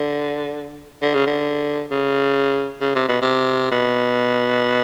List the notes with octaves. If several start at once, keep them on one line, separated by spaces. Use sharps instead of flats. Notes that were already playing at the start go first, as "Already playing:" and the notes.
Already playing: D3
D3
C#3
D3
C#3
C#3
C3
B2
C3
B2